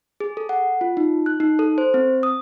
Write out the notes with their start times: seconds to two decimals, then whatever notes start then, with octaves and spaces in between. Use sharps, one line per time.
0.20 G#4
0.37 A4
0.49 F#5
0.81 F4
0.97 D#4
1.26 F#6
1.40 D#4
1.59 A4
1.78 C5
1.94 C4
2.23 D#6